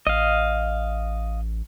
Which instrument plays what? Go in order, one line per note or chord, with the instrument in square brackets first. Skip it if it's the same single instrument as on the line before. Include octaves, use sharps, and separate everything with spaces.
[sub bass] A1 [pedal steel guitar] D#5 F5